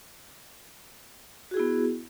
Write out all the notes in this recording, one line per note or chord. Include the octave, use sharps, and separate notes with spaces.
B3 E4 F#4 G#4